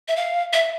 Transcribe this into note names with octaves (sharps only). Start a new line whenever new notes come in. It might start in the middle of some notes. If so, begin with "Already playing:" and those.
E5
F5
E5